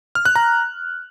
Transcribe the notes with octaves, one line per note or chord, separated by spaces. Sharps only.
F6
F#6
A#5